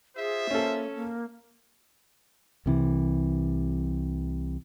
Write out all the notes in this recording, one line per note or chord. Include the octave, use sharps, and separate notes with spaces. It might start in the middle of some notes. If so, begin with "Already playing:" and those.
F4 G#4 C5 E5
A#3 C#4 A4
A#3
C2 C3 E3